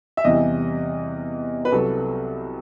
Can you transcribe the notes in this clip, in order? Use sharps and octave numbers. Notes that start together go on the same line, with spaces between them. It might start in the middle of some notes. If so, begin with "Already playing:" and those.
E5
E2 C3 E3 G3 D#5
B4
C2 C3 F#3 A4